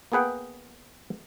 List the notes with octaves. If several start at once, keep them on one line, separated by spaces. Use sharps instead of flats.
A#3 B3 G#4 B4 F#5 G5